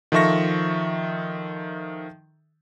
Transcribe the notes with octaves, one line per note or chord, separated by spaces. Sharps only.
D#3 F3 A4 E5 C#6 A#6